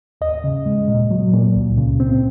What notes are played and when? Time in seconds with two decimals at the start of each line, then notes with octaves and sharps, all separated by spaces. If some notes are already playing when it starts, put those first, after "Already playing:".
0.21 D#2 D#5
0.44 C#3
0.66 G#3
0.88 A#2
1.11 F#3
1.33 A#2
1.56 C#2
1.78 C#3
2.00 C4